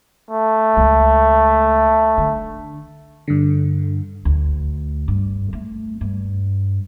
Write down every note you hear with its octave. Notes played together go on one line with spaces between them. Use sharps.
A3
C#2 B3
D3
G2 D3
D2
G2
A3
G2